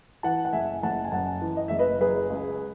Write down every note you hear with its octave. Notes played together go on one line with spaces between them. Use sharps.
E3 F#5 A5
F#5
F#1 E5 G#5
F#1 F#5 A5
G#5
F#2 F#5 A5
E3
D#5
F#1 E5
B4 D#5
F#3 G#4 B4
C#2